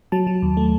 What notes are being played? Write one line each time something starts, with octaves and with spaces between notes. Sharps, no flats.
F#3 A5
F#3
D#2
A3